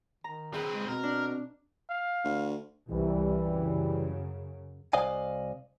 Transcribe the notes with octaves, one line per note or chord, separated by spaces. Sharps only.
D#3 A#5
C4 G#4 B4
G#3
B2 C4 A#4
D4
F5
D2
C2 E3 G3
F#2 C#3
C2 C5 D5 D#5 F5 G#5